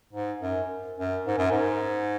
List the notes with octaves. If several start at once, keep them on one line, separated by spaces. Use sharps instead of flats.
G#2
F#2
F#2
G#2
F#2
G#2